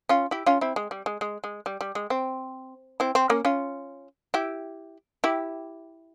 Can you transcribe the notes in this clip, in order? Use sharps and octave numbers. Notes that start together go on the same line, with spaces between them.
C#4 F4
E4 G4
C#4 F4
C4 E4
G#3
G3
G#3
G#3
G#3
G3
G3
G#3
C4
C4 E4
C4
A#3 C#4
C#4 F4
E4 G4
E4 G4